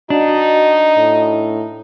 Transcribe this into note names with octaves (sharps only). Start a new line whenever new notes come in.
D4 D#4 F#4
A2